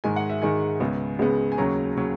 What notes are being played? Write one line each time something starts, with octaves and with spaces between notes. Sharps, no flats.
G#2 D#3 G#3 G#5
F#5
E5
G#2 D#3 G#3 G#5
C#2 C#3 G#3 B3
C#2 C#3 G#3 B3
G#5
D#2 C#3 F#3 C#4 A#5
C#3 F#3 C#4